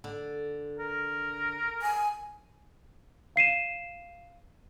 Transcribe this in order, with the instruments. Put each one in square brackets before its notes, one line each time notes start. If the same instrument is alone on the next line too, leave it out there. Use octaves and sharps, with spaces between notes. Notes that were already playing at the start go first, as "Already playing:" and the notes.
[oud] D3
[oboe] A#4
[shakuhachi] G#5
[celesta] F5 C7 D#7 E7